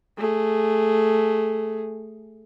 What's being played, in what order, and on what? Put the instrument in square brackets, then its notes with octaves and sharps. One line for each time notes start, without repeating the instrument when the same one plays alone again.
[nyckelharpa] A3 G#4